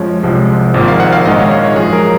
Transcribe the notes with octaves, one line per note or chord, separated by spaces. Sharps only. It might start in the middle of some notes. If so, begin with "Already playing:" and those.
Already playing: F#2 F3 G#3 C#5
C2 C3 F3 G#3
G#1 G#2 F3 A#3
F5
F#5
F5
A#1 G#2 D#3 G#3 D#5
C#5
F5
C#5
F#2 F3 G#3 G#4
A#4